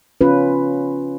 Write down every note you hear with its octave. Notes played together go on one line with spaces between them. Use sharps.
C#4 F4 B4